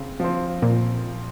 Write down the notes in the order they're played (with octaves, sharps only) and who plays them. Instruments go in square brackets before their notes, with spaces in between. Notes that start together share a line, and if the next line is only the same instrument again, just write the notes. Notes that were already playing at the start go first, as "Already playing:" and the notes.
Already playing: [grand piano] C#3 C4
F3 C4
[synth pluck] A#2